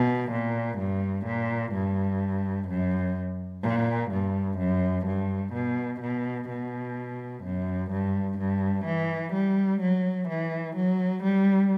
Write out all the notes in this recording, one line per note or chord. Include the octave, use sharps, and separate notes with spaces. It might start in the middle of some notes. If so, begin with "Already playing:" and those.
Already playing: B2
A#2
G2
A#2
G2
F#2
A#2
G2
F#2
G2
B2
B2
B2
F#2
G2
G2
E3
G3
F#3
E3
F#3
G3